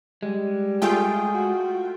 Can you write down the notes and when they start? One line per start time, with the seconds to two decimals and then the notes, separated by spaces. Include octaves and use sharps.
0.23 G3 G#3
0.82 A3 F4 G#4 G5
1.34 F#4